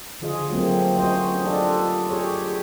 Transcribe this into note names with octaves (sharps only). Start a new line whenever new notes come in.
D3 F3 F4 G#4 D#5
F#3 A3 A#3 C4
C#4 F#4 C5 D#5
D4 F4 G4 A4 D#5
G4 G#4 C#5